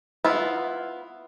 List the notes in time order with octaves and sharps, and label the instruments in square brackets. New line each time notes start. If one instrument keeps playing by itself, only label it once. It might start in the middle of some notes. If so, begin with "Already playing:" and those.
[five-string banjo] B3 E4 F4